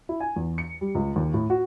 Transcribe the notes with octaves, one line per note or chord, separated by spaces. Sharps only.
E4
G#5
E2
C#7
G3
C#2
D#2
A2
F#4